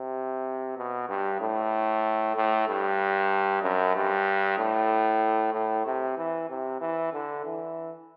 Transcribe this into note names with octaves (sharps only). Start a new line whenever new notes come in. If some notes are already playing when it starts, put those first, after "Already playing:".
Already playing: C3
B2
G2
A2
A2
G2
F#2
G2
A2
A2
C3
E3
C3
E3
D3
E3